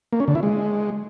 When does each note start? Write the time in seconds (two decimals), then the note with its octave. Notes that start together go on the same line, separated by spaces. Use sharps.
0.13 A#3
0.20 C#4
0.28 D3
0.35 E4
0.43 G#3